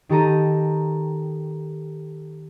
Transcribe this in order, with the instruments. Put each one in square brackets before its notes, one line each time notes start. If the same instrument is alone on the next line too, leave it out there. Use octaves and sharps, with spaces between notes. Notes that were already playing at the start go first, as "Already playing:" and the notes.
[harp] D#3 G4 A4 A#5 D#7